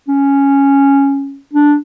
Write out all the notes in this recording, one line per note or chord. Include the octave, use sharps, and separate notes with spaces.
C#4
D4